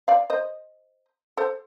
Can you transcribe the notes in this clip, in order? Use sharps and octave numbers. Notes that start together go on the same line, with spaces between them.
D5 F5
C5 D#5
A4 C5